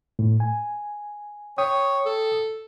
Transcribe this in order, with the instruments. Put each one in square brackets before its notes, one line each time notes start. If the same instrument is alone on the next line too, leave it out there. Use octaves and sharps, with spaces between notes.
[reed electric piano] A2
G#5
[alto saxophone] C#5 [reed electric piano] G5 D#6
[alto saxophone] A4